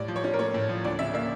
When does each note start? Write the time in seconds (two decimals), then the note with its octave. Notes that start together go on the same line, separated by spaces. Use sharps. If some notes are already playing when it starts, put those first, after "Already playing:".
Already playing: A2 G3 D5
0.08 F3
0.16 C#5
0.24 C#4
0.33 A#4
0.39 A3 C#5
0.54 A2
0.69 F3
0.84 D2 D5
0.99 C#3 E5
1.13 A#3 E5